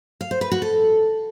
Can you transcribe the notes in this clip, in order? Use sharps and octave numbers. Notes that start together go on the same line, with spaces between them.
F5
C5
B4
F#4
A4